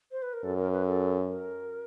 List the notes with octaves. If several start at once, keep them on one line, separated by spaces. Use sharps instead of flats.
C5
B4
A#4
F#2 A4
A#4
B4
A4
A#4